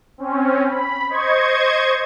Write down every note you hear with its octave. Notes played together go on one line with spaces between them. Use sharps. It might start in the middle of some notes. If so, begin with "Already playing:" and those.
C4 C#4
B5
C5 D#5 C#6 G#6